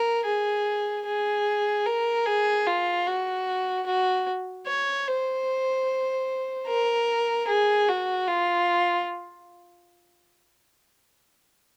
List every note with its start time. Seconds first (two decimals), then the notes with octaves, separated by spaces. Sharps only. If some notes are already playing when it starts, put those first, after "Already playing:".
Already playing: A#4
0.25 G#4
1.06 G#4
1.86 A#4
2.26 G#4
2.67 F4
3.07 F#4
3.86 F#4
4.67 C#5
5.08 C5
6.67 A#4
7.47 G#4
7.88 F#4
8.28 F4